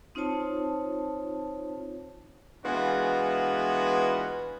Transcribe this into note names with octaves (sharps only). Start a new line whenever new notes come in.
C4 D#4 F4 C5 C#5 A5
E3 G#3 B3 D4 F4 F#4